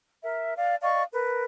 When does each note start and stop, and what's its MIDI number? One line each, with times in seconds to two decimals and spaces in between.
0.24 0.53 70
0.24 0.53 76
0.57 0.75 74
0.57 0.75 77
0.83 1.03 74
0.83 1.03 75
0.83 1.03 77
0.83 1.03 85
1.13 1.43 70
1.13 1.43 71